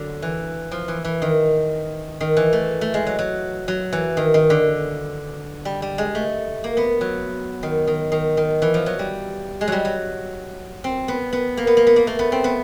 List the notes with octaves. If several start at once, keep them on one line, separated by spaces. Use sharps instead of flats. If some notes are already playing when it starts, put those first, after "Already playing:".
Already playing: D3 F#3
E3
F3
E3
E3
D#3
D#3
E3
A3
A3
G#3
F#3
F#3
F#3
E3
D#3
D#3
D3
G3
G3
G#3
A3
A#3
B3
F#3
D#3
D#3
D#3
D#3
E3
F3
F#3
G3
G#3
F#3 G3
F#3
C4
B3
B3
A#3
B3
A#3
B3
A#3
A3
B3
C4
B3